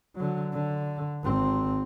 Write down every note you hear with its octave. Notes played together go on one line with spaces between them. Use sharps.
D3 F#3
D3
G#1 C4